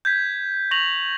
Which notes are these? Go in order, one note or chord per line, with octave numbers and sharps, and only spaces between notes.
G6 G#6 B6
C#6 A#6 F7 F#7